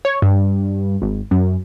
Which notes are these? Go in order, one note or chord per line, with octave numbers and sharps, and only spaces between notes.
C#5
G2
G#1
F#2